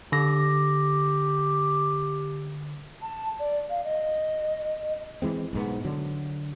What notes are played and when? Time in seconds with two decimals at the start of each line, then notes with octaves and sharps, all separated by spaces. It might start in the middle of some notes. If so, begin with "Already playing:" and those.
0.12 D3 G4 A#6
3.02 A5
3.40 D5
3.70 F5
3.85 D#5
5.22 E3 G#3 C4
5.53 B1 G#2 B3
5.84 D3 F#3